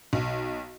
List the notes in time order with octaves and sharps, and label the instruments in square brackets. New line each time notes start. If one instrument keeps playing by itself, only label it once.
[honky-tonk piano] B1